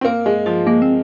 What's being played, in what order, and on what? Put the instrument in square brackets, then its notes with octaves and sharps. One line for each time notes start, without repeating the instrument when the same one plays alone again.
[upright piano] C4
[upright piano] A#3 [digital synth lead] A#4
[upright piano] G#3
[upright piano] F3 [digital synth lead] F4
[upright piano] G#3 [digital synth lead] A#3
[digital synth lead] C4